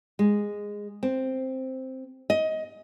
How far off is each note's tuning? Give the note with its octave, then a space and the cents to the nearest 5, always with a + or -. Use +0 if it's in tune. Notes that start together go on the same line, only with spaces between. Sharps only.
G#3 -10
C4 +0
D#5 +20